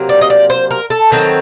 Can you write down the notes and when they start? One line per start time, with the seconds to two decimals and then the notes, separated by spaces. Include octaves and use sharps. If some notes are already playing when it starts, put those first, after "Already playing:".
Already playing: C3 F#3 A#3
0.09 D5
0.21 D#5
0.30 D5
0.50 C5
0.71 A#4
0.90 A4
1.12 D#3 F#3 C4